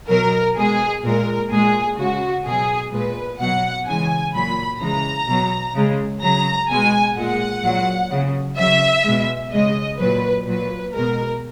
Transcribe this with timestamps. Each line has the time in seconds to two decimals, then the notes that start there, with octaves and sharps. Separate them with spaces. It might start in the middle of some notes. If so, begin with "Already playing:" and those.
0.10 B2 F#3 A#4
0.57 B2 G#3 G#4
1.04 A#2 G#3 A#4
1.51 A#2 G#3 G#4
1.98 C#3 G#3 F#4
2.46 B2 F#3 G#4
2.92 A#2 G#3 B4
3.39 B2 F#3 F#5
3.87 C#3 E3 G#3 G#5
4.33 A#2 F#3 B5
4.81 C#3 E3 G#3 A#5
5.28 B2 F#3
5.75 C#3 G#3
6.22 C#3 F#3 A#5
6.70 B2 G#3 G#5
7.17 A#2 G#3 F#5
7.64 A#2 F#3
8.11 C#3 F#3
8.58 C#3 F#3 E5
9.05 B2 G#3
9.52 C#3 G#3 D#5
9.99 A#2 F#3 B4
10.47 A#2 F#3 B4
10.94 B2 G#3 A#4